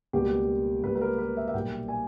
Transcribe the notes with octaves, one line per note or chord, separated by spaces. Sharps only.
C#2 B2 G3 A#3 G4
C#2 B2 G3 A#3 B4
B4
A#4
B4
E5
E5
B1 A#2 G3 A#3 G5
G#5